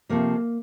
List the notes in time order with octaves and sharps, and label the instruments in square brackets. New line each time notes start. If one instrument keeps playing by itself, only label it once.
[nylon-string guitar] C3 F3 A3 A#3